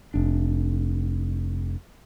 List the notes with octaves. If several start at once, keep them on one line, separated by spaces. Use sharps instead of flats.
F1 D4